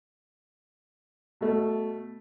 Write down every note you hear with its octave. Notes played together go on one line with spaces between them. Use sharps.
B2 A3